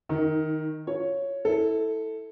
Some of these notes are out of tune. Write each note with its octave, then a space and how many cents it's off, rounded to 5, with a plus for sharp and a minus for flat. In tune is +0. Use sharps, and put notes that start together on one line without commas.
D#3 +0 D#4 +35
F4 +0 C#5 +0
E4 -20 A4 +5